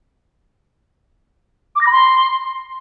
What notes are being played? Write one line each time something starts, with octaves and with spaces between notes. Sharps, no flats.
D6
A#6
B5
C6